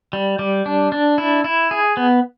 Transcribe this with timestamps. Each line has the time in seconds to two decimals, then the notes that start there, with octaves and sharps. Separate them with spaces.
0.13 G3
0.39 G3
0.66 D4
0.92 D4
1.18 E4
1.44 E4
1.71 G#4
1.97 B3